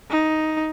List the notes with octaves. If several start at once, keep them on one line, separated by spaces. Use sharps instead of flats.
D#4